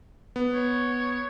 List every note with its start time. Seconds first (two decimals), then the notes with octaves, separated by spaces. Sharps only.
0.36 B3
0.54 C#5